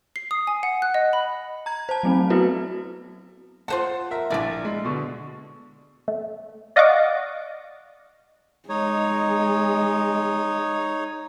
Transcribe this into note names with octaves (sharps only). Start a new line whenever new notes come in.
C7
D#6
G#5
F#5
F#6
D#5
B5
A#5 G#6
C5 A5
F#3 A3 C4
B3 E4 F#4 B4
F4 C5 F#5 A5
A#4 E5
A#1 D4 E4 D5
G#3
B2 D3
A3
D5 D#5 F5 F#5 C#6 D6
G#3 D#4 C#5